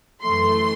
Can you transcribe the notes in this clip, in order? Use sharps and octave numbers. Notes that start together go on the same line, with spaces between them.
F#2 E3 A3 C6